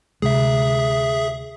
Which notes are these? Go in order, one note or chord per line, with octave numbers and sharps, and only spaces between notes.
D2 C3 G#3 G#4 E5